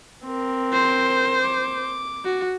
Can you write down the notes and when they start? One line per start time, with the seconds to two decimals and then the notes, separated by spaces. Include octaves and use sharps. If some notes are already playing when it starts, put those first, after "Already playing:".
0.24 C4 A#4
0.73 C5
1.42 D6
2.25 F#4